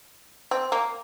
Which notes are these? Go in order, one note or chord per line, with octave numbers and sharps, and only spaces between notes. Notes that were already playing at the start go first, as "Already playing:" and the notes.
C4
A#3